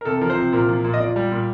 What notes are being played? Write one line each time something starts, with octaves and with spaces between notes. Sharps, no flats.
A#4
C3 A4
F3 A#4
C5
C3
A#2 A#4
F3
A#2
D#5
A#2 D5
G3
A#2